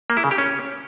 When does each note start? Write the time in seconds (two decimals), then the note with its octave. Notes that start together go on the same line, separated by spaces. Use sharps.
0.10 A#3
0.17 E4
0.24 C#3
0.31 G4
0.38 C#4